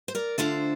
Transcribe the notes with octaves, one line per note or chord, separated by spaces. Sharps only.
C5
A#4 D5
D3 A3 D4 F4 A4 C5